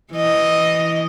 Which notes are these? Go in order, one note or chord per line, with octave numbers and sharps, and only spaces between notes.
E3 D#5